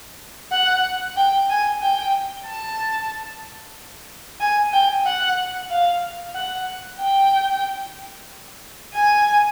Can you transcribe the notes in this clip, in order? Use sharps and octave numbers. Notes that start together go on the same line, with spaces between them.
F#5
G5
G#5
G5
A5
G#5
G5
F#5
F5
F#5
G5
G#5